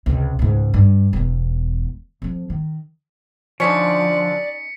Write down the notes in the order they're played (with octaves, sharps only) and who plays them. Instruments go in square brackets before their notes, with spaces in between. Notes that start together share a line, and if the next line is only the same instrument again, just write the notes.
[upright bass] C#2 C3
C#2 G#2
G2
E1 E2
F2 F3
D#3
[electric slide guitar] D3 F3 [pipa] C#4 D#4 [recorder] D5 [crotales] B6 C#7